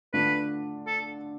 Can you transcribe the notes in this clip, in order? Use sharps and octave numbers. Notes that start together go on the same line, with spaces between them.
D3 A3 D4 F4 B4
A4